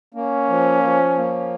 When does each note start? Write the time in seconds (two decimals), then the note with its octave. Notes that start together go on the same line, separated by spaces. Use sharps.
0.14 A#3 C#4
0.49 F3
0.83 F3
1.17 A#3